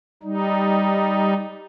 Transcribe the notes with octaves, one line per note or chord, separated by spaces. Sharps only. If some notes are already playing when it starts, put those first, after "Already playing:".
G3 D#4